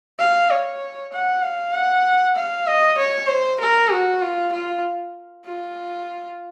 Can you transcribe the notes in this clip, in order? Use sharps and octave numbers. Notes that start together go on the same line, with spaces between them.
F5
C#5
F#5
F5
F#5
F5
D#5
C#5
C5
A#4
F#4
F4
F4
F4